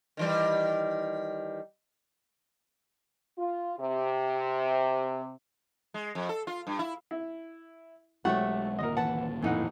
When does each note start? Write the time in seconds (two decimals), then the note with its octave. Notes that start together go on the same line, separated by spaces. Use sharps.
0.17 D#3 E3 G3
3.38 F4
3.79 C3
5.94 G#3
6.15 F2
6.29 A4
6.47 F4
6.67 G2
6.79 E4
7.11 E4
8.25 B1 F#3 G#3 A3 G4 C#5 E5 F#5
8.79 G1 D#2 A#2 A#4 D#5
8.97 E3 B4 F#5 A5
9.43 F2 A2 E3 D#4 F#5